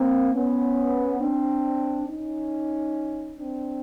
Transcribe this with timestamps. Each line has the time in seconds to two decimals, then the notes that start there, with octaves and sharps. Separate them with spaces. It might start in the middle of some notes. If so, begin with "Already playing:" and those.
Already playing: A#3 C4
0.33 B3 C#4
1.20 C4 D4
2.07 C#4 D#4
3.38 C4 D4